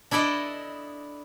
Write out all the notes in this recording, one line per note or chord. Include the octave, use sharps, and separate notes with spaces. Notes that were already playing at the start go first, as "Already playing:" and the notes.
D4 E4 A4 D5 D#5